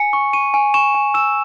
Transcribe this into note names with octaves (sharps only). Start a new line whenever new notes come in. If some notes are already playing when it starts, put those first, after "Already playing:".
Already playing: G#5 C#7
C#6
C#6 D#7
G#5
C#6 E7
G#5
E6 E7